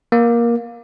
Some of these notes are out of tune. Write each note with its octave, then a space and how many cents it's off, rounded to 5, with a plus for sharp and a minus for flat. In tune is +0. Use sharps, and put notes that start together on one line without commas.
A#3 +15